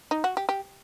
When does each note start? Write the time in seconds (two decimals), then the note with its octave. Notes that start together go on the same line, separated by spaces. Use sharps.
0.11 D#4
0.24 F#4
0.37 G4
0.49 G4